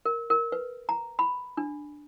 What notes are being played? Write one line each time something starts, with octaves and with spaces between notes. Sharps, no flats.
A#4
A#4
B4
A#5
B5
D4